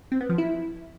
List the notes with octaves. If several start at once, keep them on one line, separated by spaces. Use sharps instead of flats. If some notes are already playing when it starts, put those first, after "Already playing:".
C4
B3
F3
E4